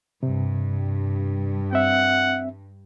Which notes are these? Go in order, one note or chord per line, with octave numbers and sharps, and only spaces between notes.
G2 C3
C4 E5 F#5